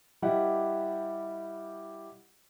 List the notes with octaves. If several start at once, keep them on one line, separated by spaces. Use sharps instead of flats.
G3 E4 G4 D#5 F#5